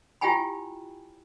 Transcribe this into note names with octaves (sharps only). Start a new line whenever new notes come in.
E4 F4 G4 G5 G#5 B5